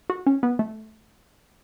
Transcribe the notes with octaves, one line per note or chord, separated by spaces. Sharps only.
F#4
C#4
B3
A3